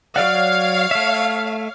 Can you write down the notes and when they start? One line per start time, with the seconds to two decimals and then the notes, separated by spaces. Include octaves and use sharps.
0.16 F#3 C#5 D5 F5 F#5
0.91 A3 E5